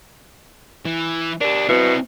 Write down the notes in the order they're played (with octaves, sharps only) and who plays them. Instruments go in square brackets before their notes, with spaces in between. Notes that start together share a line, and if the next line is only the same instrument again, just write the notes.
[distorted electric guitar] E3
[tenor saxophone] D4 [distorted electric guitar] G4 A#4
[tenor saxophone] B2 [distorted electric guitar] C4 E4